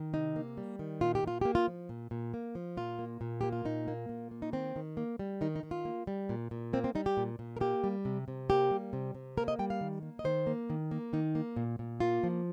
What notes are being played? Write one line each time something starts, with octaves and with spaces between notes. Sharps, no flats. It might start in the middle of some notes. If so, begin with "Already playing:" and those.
Already playing: D#3
C3 D#4
A#3
G3
D#3
A#2 F4
G4
A#2 F4
A#3 G4
F4
F3
A#2
A#2
A#3
F3
A#2 F4
A#3
A#2
A#3 G4
F4
A#2 D#4
A#3
A#2
A#3
D#4
D#3 C4
D#3
A#3
G3
D#3 D#4
D#4
D#3
F4
A#3
G3
A#2
A#2
A#3 C4
C4
G3 D#4
G4
A#2
A#2
A#4
A#3 G4
G3
C3
C3
A#3 G4
G3
C3
C3
A#3 A#4
D#5
G3 G5
F5
D#3
A#3
D#5
D#3 C5
A#3
D#3
A#3
D#3 D#4
A#3
A#2
A#2
A#3 F4
F3